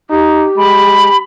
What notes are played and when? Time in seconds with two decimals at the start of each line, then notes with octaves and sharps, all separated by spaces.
0.10 D#4 G4
0.57 G#3 B5